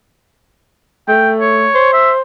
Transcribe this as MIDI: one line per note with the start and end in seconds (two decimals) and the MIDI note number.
1.08 1.68 57
1.08 1.31 79
1.41 1.93 73
1.75 2.21 72
1.93 2.11 76